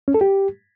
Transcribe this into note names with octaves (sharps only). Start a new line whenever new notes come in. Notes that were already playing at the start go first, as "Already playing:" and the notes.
C#4
A4
G4